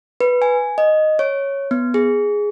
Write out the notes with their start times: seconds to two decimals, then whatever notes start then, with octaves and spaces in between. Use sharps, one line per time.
0.21 B4
0.42 G#5
0.78 D#5
1.19 C#5
1.71 B3
1.94 G#4